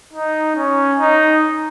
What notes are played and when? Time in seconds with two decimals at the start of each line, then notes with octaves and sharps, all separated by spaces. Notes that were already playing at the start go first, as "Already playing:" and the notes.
0.13 D#4
0.56 C#4
1.00 D#4